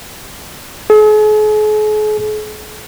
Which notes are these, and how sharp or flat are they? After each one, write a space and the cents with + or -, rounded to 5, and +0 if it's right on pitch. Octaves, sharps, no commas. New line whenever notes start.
G#4 +45